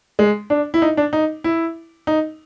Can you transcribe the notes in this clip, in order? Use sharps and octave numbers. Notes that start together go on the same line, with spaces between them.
G#3
D4
E4
D#4
D4
D#4
E4
D#4